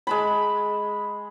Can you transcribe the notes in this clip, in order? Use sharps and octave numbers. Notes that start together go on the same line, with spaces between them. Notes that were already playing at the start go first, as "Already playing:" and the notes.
G#3 A5 B5